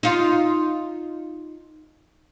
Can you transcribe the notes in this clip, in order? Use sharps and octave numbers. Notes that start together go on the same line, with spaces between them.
D#4 F4